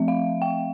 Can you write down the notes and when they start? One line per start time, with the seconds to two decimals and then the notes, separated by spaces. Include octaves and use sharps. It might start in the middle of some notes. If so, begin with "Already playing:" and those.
Already playing: F3 A3 C4 E5
0.08 F5
0.42 G5